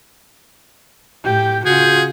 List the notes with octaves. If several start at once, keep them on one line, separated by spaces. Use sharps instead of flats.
A2 G4 G6
C#3 F4 F#4 G#4 G6